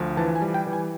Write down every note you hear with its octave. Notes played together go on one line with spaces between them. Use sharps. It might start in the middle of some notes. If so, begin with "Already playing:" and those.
Already playing: D2 F3
E3 A5
G#5
G3
G5
E3
G#5